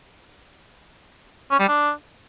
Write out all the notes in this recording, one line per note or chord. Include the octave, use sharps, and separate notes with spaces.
C#4
G3
D4